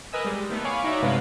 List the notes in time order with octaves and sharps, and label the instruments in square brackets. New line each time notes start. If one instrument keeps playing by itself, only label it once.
[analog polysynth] A#4 B4 D#5 G#5 E6
G3 G#3
D#3 A3 B3
C#5 F5 G#5 B5 C#6 D6
D#4 F#4 C#5 D5 E5
G2 C3 G#3 B3 B4 F5